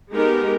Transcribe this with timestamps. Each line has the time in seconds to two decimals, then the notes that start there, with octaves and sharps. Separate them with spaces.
0.12 G#3 B3 D#4 G4 A#4